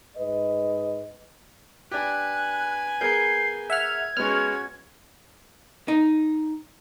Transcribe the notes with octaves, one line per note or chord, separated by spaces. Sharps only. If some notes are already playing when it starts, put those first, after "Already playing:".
G#2 B4 D#5
D4 G4 B4 G#5 F#6
B3 G#4 A#4 G6 G#6 C7
E5 F#5 F6 G#6
G#3 B3 C#4 F#4 F6
D#4